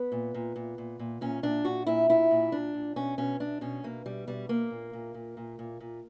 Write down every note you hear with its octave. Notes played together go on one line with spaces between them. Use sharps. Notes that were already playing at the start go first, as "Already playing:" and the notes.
Already playing: B3
A#2
A#2
A#2
A#2
A#2
A#2 C#4
A#2 D4
A#2 F#4
A#2 E4
A#2 E4
A#2
A#2 D4
A#2
B2 C#4
B2 C#4
B2 D4
B2 C#4
B2 A#3
B2 G3
B2 G3
B2 A#3
A#2
A#2
A#2
A#2
A#2
A#2